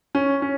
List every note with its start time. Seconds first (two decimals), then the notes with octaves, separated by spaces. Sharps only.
0.15 C#4
0.42 C#4